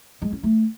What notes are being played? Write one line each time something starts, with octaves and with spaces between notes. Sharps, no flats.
G#3
C#4
A3